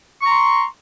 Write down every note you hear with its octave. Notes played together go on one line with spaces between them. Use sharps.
A#5 C6 C#6